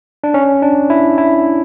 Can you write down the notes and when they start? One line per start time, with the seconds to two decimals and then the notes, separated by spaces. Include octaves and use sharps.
0.24 D4
0.34 C#4
0.62 D4
0.90 E4
1.18 E4